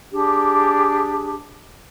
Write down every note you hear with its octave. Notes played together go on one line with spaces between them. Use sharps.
D4 G4 G#4